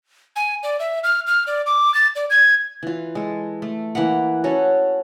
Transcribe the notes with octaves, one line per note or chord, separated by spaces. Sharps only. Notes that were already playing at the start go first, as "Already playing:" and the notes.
G#5
D5
E5
F6
F6
D5
D6
A6
D5
G#6
E3 F4
G#3 A4
A3
E3 A#3 B4 F#5
C#4 F#4 A4